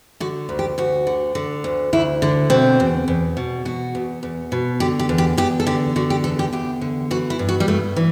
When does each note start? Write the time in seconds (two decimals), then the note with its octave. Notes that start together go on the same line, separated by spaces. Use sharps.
0.20 D3 F#4
0.49 D2
0.59 G4
0.78 D2 F#4
1.07 D3
1.35 D3
1.64 D2
1.93 D2 E4
2.22 D3 D4
2.50 B2 C4
2.80 E2
3.08 E2
3.37 B2
3.65 B2 F#4
3.95 E2
4.23 E2
4.52 B2
4.80 D3 G4
4.99 G4
5.09 E2
5.18 G4
5.38 E2 G4
5.60 A4
5.66 D3 G4
5.96 D3 F#4
6.10 G4
6.24 E2 A4
6.39 G4
6.53 E2 G4
6.81 D3
7.11 E3 F#4
7.30 E4
7.39 G2
7.49 F#4
7.60 G3
7.68 G2 A3
7.96 E3